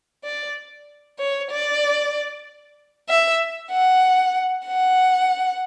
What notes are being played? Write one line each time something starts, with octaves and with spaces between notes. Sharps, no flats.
D5
C#5
D5
E5
F#5
F#5